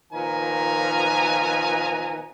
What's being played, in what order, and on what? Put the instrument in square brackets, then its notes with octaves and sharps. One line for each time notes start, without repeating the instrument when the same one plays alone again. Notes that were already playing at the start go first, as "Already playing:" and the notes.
[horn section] A#2 D#3 F3 B3 G#5 A#5